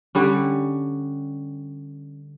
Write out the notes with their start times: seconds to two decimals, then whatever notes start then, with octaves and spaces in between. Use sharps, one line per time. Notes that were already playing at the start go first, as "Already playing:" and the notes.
0.15 D3 G3 C#4